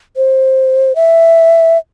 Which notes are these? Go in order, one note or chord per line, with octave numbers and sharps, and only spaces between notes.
C5
E5